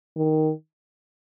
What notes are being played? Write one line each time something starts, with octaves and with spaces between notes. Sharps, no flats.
D#3